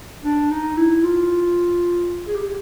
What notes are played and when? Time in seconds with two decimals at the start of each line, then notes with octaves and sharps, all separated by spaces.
0.24 D4
0.51 D#4
0.77 E4
1.03 F4
2.28 G#4
2.35 G4